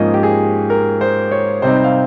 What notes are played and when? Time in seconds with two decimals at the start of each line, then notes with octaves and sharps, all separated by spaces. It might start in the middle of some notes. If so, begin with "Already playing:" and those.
Already playing: G#2 F3 A#3 C#4 D#5
0.14 G4
0.23 G#4
0.70 A#4
1.01 C5
1.32 C#5
1.62 C3 G3 C4 D#4 C5
1.84 F5